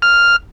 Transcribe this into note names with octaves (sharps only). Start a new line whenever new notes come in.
F6